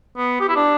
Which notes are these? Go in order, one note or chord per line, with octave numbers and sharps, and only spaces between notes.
B3
G4
E4
D4